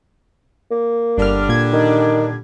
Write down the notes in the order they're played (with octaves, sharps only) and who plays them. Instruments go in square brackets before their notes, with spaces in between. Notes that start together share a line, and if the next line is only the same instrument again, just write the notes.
[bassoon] A#3
[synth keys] G1 F6 [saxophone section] D3 G3 D4
[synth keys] A#2 G#6
[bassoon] D#3